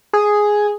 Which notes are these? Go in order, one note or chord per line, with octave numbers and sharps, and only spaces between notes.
G#4